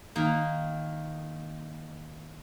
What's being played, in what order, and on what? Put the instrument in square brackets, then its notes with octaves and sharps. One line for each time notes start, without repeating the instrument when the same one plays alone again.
[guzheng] D#3 A#3